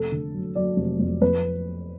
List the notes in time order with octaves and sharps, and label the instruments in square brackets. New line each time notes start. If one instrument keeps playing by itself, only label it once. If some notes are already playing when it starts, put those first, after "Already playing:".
Already playing: [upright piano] F1 A4
D3
F#3
F#3 D5
F1
F2
F2 B4